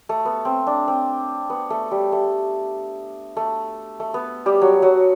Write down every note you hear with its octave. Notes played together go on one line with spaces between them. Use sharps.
A3
B3
C4
D4
C4
B3
A3
G3
A3
A3
A3
B3
G3 G4
F#3 F#4
F#3 F#4